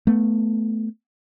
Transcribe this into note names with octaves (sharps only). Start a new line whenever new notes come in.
A3 B3